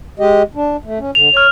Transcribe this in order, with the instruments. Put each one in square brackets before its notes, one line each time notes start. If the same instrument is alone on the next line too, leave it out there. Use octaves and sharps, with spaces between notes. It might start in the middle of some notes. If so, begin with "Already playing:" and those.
[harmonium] G#3 G4 D#5
D4
A3
C#4
[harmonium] D3 [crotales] F7
[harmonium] C#5 [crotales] F6 F7